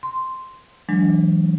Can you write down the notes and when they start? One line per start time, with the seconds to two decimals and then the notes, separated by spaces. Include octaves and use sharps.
0.03 C6
0.89 E3 F#3 G#3 D4